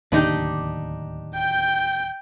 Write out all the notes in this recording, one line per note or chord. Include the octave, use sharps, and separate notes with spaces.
D1 D#2 C3 D4 D#4 G4
G5 G6